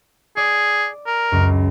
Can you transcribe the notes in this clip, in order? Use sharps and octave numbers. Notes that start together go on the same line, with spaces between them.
G#4 D5
A#4
C#2 F#2